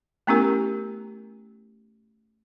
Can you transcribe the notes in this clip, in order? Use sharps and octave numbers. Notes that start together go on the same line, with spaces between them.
A3 B3 C#4 E4 G4 A#4